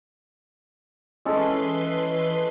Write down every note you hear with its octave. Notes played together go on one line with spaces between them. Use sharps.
E3 G#3 C#4 A4 B4 C6